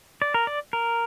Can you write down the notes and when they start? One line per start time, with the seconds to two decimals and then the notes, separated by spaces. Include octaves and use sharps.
0.22 D5
0.34 A#4
0.47 D5
0.73 A#4